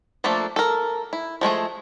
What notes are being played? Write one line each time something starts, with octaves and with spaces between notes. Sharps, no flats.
F3 A3 A#3 D4 A4
A4 A#4
E4
F3 G#3 A3 G#4